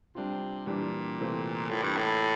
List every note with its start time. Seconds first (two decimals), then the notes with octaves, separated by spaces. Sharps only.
0.15 C3 G3 D4 F4
0.67 A#2 E3 G3 D4 G4
1.19 C3 E3 A3 C4 F4
1.70 A2 E3 A#3 F4
1.83 G2
1.97 A2